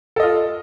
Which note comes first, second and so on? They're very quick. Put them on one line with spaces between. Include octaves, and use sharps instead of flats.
A4 D#5 F4